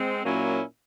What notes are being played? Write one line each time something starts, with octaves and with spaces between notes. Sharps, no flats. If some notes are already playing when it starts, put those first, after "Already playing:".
Already playing: G#3 C4
A#2 F#3 A#3 C#4 E4